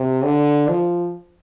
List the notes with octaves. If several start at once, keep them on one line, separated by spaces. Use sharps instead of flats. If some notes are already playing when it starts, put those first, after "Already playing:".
Already playing: C3
D3
F3